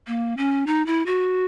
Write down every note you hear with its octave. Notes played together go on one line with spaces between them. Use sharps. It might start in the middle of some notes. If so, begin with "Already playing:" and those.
A#3
C#4
D#4
E4
F#4